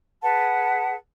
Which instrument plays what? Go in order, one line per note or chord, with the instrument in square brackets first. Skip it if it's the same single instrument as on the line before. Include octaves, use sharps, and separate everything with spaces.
[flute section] G#4 B4 F#5 A5